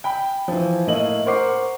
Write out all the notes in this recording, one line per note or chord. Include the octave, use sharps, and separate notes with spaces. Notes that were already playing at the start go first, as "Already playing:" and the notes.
G5 B5
E3 F3
A2 A#3 E4 D#5 F#7
A#4 C5 F#5 C#6 D6 C7